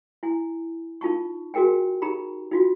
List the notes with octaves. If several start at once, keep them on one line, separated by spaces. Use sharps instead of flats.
E4 G#5
D#4 F4 A5 C#6
F#4 G#4 A#4 G5 G#5
D#4 G4 A#5 B5
D#4 F4 F#4